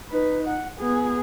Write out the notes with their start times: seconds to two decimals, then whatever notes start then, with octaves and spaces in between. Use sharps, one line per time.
0.10 D#4 B4
0.48 F#5
0.79 B3 G#4